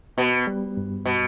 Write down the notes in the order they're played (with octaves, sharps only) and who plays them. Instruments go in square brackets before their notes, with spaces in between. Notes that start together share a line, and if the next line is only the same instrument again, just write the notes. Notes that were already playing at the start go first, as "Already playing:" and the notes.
[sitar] B2 [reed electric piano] B3
[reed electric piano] G3
G2
[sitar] B2